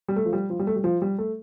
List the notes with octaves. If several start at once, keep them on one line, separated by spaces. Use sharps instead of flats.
G3
A3
F3
G3
F3
G3
A3
G3
F3
G3
A3